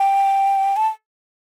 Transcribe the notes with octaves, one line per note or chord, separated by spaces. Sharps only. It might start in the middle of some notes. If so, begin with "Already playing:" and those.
Already playing: G5
A5